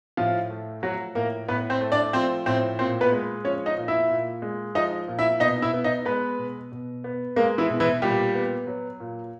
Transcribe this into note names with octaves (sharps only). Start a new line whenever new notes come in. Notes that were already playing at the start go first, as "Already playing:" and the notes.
A2 F3 F4
A3
F3 F#3 F#4
A2 A#3 A#4
A2 B3 B4
C4 C5
A3
D4 D5
F3 C4 C5
A2 C4 C5
A#2 C4 C5
B3 B4
G#3
F3 C#4 C#5
D#4 D#5
A#2
E4 E5
A#2
G#3
F3 D#4 D#5
A#2
E4 E5
B2 D#4 D#5
E4 E5
B3
D#4 D#5
G#3 B3 B4
B2
B2
B3
G#3 A#3 A#4
E3 E4
B2
E3 E4
A#2 G3 G4
B3
F#3
A#2